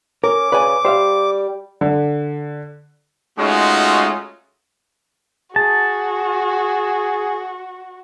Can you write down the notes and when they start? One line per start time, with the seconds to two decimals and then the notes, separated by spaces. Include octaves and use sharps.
0.24 C#4 A#4 D6
0.52 C#3 B4 D5 G#5
0.85 G3 C5 E5 F5
1.81 D3
3.39 G#3 A3 C#4 D#4 F4 F#4
5.56 F#4 G#4 A5